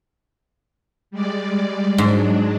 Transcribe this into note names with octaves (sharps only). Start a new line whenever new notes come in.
G3 G#3 D5
G#2 F#3 G#3 D4